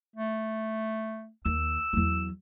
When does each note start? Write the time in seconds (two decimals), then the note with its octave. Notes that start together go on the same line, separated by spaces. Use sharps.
0.16 A3
1.45 D#2 E6
1.93 E2 F#3